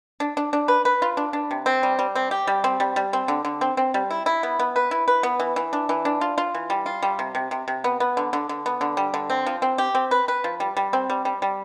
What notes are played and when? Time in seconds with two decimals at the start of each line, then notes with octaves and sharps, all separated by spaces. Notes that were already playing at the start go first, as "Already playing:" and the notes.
0.20 D4
0.37 D4
0.53 D4
0.68 B4
0.85 B4
1.02 F4
1.17 D4
1.33 D4
1.51 C3
1.66 C4
1.83 G3
1.99 G3
2.15 C4
2.31 G4
2.47 G3
2.64 C4
2.80 G3
2.96 G3
3.13 C4
3.28 D3
3.45 D3
3.61 C4
3.77 C4
3.94 G3
4.10 E4
4.26 E4
4.43 B3
4.59 B3
4.76 B4
4.91 E4
5.08 B4
5.23 B3
5.40 E3
5.56 E3
5.73 D4
5.89 E3
6.05 D4
6.21 F4
6.38 F4
6.54 E3
6.70 G3
6.86 F4
7.03 G3
7.19 C3
7.35 C3
7.51 C3
7.68 C3
7.84 B3
8.00 B3
8.17 D3
8.33 D3
8.49 D3
8.66 B3
8.81 D3
8.97 G3
9.14 D3
9.30 C4
9.46 F3
9.62 C4
9.78 G4
9.95 C4
10.11 B4
10.28 B4
10.44 F3
10.60 G3
10.77 G3
10.93 C4
11.10 G3
11.25 G3
11.42 G3